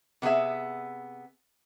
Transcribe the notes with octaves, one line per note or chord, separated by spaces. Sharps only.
C3 B3 C#4 G#4 E5